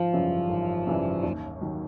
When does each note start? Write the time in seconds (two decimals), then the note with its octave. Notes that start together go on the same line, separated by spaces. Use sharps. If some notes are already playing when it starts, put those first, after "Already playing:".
Already playing: G#1 F3
0.12 F#2 C#3 E3 G3
0.49 G#1
0.87 F#2 C#3 E3 G3
1.23 D#2
1.61 D#3 F#3